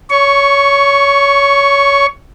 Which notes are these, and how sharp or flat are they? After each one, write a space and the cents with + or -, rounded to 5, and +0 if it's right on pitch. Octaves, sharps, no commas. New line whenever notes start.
C#5 +20 C#6 +0